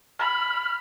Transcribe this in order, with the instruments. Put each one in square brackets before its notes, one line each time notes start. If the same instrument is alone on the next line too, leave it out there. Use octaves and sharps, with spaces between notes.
[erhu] B5 [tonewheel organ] F6